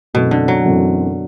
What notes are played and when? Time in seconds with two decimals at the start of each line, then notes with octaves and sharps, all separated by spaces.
0.14 F#2 B2 E3 A3 C4
0.31 D3
0.48 F#3
0.65 F#2 E3 A3 C4